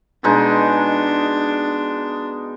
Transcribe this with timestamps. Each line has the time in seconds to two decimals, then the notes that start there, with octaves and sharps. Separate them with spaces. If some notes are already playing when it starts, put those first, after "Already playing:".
0.24 B2 G#3 D4 D#4